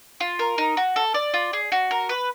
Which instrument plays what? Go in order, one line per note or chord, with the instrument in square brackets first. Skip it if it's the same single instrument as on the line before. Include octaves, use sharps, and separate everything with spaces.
[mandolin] F4
A#4
D#4
F#4
A4
D5
F4
G#4
F#4
A#4
B4